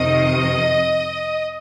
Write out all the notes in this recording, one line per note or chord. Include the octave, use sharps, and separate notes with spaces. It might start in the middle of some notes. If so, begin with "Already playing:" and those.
Already playing: F2 C3 D#3 D#5